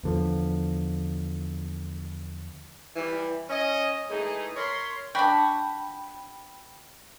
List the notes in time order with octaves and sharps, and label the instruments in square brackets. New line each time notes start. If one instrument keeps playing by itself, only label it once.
[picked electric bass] E2 D3 F3
[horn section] E3 G3
C#4 D#5
E3 G#3 A3 D#4 G#4
A#4 C#5 B5 C6
[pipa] D4 F#4 [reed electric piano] G5 B5